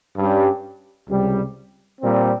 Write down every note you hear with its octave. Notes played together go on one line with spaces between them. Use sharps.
G2 G3 C#4 G4
C#2 C3 G3
A#2 G3 C4